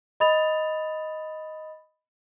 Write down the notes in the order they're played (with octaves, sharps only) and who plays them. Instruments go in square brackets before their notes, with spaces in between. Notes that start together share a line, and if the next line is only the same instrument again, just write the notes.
[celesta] D#5 B5 D#6 A6 F7